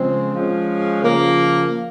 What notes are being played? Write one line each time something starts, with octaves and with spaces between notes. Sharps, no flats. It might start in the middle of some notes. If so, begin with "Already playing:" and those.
Already playing: C#3 F3 G#3 C4
F3 G#3 C#4
C#3 F3 A#3